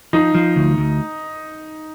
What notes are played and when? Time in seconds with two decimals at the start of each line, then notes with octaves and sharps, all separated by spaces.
0.13 F3 D#4
0.35 F3
0.56 D2
0.78 D2